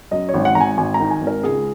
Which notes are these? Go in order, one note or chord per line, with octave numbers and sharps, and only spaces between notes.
F#2 D#5
C#5
G#1
F#5
G#1 A#5
G#5
G#1 G#5
A#5
D#3
G#5
G#1
A#4
C#2 G#4